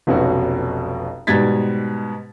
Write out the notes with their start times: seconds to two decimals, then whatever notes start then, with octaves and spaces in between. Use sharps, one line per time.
0.07 F1 B1 B2 C#4 F#4
1.27 G#2 B2 G3 G#6 A6 B6